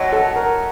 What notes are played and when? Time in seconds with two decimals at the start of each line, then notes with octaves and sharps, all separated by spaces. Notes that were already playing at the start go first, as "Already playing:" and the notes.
Already playing: F#2 F#3 C#5 D#5
0.13 A4
0.36 A#4